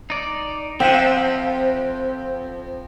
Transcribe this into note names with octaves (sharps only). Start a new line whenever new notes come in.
D#4 D5
F2 F3 C4 C5 E5 F#5 G5